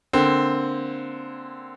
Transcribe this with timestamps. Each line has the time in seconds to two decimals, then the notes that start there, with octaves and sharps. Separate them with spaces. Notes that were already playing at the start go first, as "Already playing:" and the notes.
0.13 D3 A#3 C4